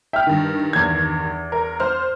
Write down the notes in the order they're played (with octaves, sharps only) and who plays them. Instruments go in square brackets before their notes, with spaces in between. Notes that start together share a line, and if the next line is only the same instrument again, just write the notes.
[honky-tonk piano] E5 [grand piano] G5 F6
[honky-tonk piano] G2 D#3
[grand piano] E2 G#6
[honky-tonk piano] A#4
C5 F6